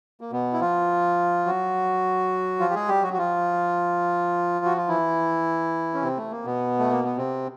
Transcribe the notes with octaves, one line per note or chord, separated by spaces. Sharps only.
A#3
B2 B3
E4
F3 F4
F#3 F#4
F3 F4
G4
G#3 G#4
G3 G4
F#3 F#4
F#4
F3 F4
F#4
F4
E3 E4
C#4
C3 C4
A3
A#3
B2 B3
A3
A#3
B3
C3 C4